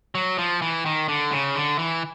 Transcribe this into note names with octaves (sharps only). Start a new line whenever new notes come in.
F#3
F3
E3
D#3
D3
C#3
D3
E3